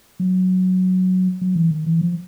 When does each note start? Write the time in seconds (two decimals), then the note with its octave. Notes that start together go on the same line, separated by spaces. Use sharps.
0.20 F#3
1.42 F#3
1.56 E3
1.71 D#3
1.86 E3
2.01 F3